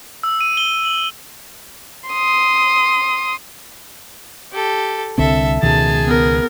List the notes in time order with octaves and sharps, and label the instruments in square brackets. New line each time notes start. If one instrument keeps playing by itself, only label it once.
[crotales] E6
D#7
G7
F#7
[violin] C6 D#6
[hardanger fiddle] G4 A4
[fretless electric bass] C2 D3 C4 [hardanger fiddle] A4 E5
[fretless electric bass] C#2 B2 D#3 [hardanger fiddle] G#4 [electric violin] A5
[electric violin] B3 A#4